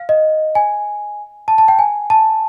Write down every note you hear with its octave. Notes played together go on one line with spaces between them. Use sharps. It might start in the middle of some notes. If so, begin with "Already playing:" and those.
Already playing: F5
D#5
G#5
A5
A5
G5
G#5
A5